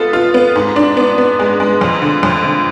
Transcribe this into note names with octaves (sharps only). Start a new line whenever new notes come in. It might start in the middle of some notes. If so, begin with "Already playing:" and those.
Already playing: B3 F4 A4
F4
B3
G#2
D4
B3
B3
G#3
G#3
F2
D3
F2
D3